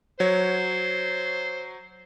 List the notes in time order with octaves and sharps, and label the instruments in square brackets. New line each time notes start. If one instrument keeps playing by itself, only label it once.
[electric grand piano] F#3 C#5 [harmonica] C5